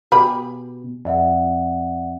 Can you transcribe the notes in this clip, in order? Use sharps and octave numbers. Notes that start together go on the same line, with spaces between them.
B2 G4 G#4 B5
F2 D5 E5 F#5